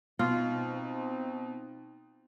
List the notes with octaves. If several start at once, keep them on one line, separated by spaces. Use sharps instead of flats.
B2 C4 D#4 F4